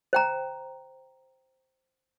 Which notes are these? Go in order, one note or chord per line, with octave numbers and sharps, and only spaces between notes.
C5 G5 A#5